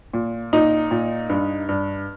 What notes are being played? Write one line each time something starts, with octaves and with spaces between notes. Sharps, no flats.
A#2
A#2 D#4
A#2
G2
G2